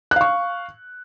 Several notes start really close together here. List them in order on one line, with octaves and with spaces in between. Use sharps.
F#6 F5 C#6